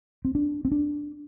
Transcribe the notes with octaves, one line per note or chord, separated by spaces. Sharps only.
C4
D4
C4
D4